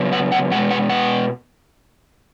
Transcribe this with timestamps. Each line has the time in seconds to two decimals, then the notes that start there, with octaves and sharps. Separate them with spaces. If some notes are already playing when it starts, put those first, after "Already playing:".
Already playing: C#3 F#3 B3
0.13 F#5
0.32 F#5
0.51 B2 G#3 B3 F#5
0.71 F#5
0.90 F#5